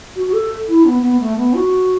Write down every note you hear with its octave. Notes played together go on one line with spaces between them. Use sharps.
F#4
F#4
A4
E4
B3
B3
A3
B3
F#4